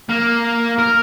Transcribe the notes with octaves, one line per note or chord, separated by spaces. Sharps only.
A#3
A#4